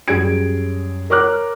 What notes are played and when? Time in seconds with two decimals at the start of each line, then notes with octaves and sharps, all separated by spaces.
0.08 F#2 G3 G#4 G#6 D7
1.10 A#4 C#5 A#5 D6 F6 F#6